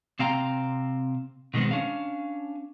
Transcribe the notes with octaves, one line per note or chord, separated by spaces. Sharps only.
C3 C4 F5 G5 A#5
B2 D#3 G#3 B3 C4
C#4 D4 F5